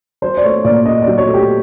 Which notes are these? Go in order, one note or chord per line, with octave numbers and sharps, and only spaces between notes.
F#3 C5
D5
A3 C#5
A#2 D5
C#4 D#5
D5
F#3
C#5
A3
G4